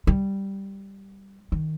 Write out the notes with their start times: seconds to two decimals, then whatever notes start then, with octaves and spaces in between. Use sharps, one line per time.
0.07 G3
1.52 D#3